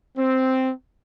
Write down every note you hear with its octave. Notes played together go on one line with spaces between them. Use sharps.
C4